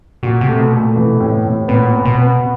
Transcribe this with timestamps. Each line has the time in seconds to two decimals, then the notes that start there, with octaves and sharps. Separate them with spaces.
0.23 A#2 F#4
0.41 C3
0.48 A3
0.59 B2
0.72 A3
0.77 A#2
0.96 B2 E3
1.14 C3
1.20 A2
1.32 B2
1.45 A2
1.50 C3
1.68 A#2 B3
1.93 B3
2.05 B2
2.17 B3